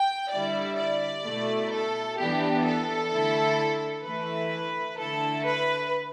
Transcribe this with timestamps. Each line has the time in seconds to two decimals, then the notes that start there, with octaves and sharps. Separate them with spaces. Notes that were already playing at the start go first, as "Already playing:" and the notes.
Already playing: G5
0.32 D3 G3 E4 D5
0.78 D5
1.25 B2 A3 E4
1.72 A4
2.19 E3 B3 D4 G4
2.65 A4
3.12 D3 A3 E4
4.05 E3 A3 E4 B4
4.99 D3 A3 E4 A4
5.45 B4